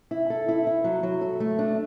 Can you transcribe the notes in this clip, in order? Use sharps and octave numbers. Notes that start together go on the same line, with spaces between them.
E4
A4
E4
E4
F#3
F#3
A4
A3
D4